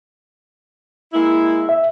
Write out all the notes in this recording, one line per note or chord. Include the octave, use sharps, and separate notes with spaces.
G#3 A#3 E4
E5